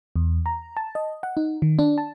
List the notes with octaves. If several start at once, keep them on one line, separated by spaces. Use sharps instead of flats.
E2
A#5
A5
D#5
F#5
D#4
D#3
D4
A5